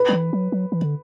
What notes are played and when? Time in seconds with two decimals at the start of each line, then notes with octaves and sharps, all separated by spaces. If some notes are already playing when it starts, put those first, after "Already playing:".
Already playing: B4
0.09 F#3
0.13 E3
0.33 F#3
0.52 F#3
0.72 E3
0.82 D3